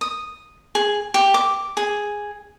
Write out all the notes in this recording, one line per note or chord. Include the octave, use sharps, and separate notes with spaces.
D#6
G#4
G4
D6
G#4